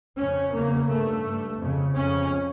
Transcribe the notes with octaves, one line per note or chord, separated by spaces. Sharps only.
F2 C#3 C#4
E2 C#3 A#3
G2 A3
G2
F2 C#3
F2 C#3 C#4